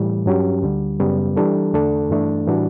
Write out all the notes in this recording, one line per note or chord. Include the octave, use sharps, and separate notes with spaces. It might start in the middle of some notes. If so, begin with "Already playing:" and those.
Already playing: A2 E3 G3
G2 F#3 C#4 G4
D2 D3 G3
F#2 C#3 G3 B3
E3 G3 D4 A4
E2 D3 A3 D4 A4
G2 E3 A3 D4
A2 E3 G3 D4 F#4